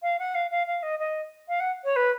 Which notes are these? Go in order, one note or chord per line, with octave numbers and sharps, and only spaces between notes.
F5
F#5
F5
F5
F5
D#5
D#5
F5
F#5
C#5
B4